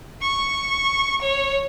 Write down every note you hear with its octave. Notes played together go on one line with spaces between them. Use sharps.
C#6
C#5